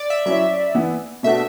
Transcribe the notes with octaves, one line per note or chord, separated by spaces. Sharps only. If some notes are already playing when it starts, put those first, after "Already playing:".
Already playing: D5
E5
F#3 C#4 E4 E5
E3 B3 E4
B2 A3 D4 F#4 E5